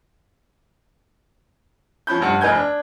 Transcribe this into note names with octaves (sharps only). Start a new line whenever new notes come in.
F3 C#4 B5 G6
F1 G2 F#5
F1 D#4 B4 G#5 G6 G#6
D4